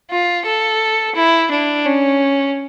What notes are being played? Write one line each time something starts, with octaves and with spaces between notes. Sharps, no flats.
F4
A4
E4
D4
C#4